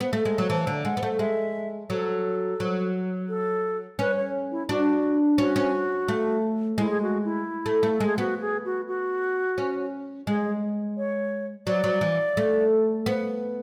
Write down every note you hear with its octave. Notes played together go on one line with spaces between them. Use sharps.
B3
A3
G#3
F#3
E3 A5
D3
G#3 F#5
B3
A3
G#3 E5
F#3 A4
F#3
A4
C#4 B4
C#5
E4
D4 F#4
C#4 F#4
C#4
A3
G#3 E4
G#4
F#4
E4
A3
A3
A4
G#3
G#4
B3 F#4
G#4
F#4
F#4
C#4
G#3 G#4
C#5
F#3 D5
F#3
E3
A3
B3